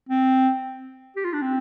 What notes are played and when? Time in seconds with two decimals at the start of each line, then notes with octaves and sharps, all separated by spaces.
0.09 C4
1.16 G4
1.24 F4
1.33 D4
1.42 C4